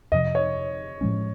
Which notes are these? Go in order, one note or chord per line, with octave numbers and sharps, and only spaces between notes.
F2 C3 F3 D#5
C#5
A2 F3 G#3 C#4